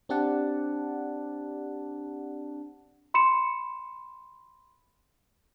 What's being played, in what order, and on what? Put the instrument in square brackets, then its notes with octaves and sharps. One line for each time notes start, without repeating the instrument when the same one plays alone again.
[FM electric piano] C4 D4 G4 D5 F#5 A5
[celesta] B5 C6 C#7 E7